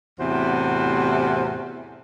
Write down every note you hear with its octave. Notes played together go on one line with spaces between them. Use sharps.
E2 A2 C3 F#4 C5